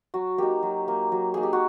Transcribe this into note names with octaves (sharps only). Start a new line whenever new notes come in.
F#3 F#4
A#3 D#4 G4
F#3
A#3 D#4
F#3
A#3 D#4 G#4
G4
F#4